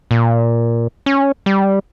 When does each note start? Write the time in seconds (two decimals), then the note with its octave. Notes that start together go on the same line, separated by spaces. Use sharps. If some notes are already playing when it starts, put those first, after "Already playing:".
0.11 A#2
1.06 C#4
1.46 G3